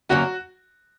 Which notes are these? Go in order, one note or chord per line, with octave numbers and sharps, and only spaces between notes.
F#2 D3 F#3 A#3 C#4 F#4